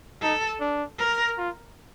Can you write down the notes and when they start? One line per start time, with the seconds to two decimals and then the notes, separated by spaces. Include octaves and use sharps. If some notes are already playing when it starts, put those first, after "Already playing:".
0.22 D#4 A4
0.60 D4
0.99 A#4
1.38 F4